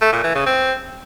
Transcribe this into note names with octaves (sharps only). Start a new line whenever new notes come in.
A3
A#2
E3
C#3
C4